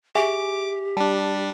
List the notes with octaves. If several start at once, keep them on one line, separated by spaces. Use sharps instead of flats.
G4 G#4 E5 G#5 D6
G3 D4 A5